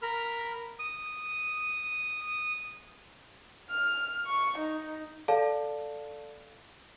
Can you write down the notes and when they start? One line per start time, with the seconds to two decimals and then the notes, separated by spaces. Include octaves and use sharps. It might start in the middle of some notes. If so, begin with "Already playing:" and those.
0.02 A#4 B5 F6
0.79 D#6
3.70 F6
4.26 C#6
4.58 D#4
5.28 A4 D5 F5 A5